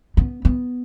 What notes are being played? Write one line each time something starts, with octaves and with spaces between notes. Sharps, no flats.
B3
B3